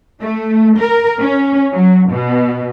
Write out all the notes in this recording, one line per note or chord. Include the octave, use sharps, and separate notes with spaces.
A3
A#4
C#4
F#3
B2